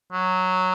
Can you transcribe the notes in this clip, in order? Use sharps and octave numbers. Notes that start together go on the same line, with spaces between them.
F#3